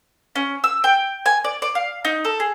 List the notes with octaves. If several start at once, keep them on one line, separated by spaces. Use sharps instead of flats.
C#4
E6
G5
G#5
D5
D5
F5
D#4
A4
G#4